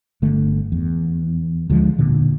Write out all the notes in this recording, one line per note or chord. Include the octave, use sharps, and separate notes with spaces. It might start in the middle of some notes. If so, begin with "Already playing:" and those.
G1 D3 A3
E2
D2 D3 F3 G#3
E1 A#2 D3